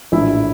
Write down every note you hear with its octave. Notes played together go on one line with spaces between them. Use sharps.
A#1 A2 E3 E4